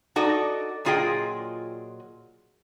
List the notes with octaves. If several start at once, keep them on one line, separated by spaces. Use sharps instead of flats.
D#4 F#4 A4 D5 D#5
A#2 F#3 F4 G#4 D#5 G5